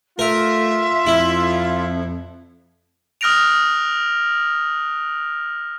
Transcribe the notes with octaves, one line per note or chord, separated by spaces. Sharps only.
A3 F4 A#4 E5
F2 E4
D#6 F6 F#6 A#6 D7 F7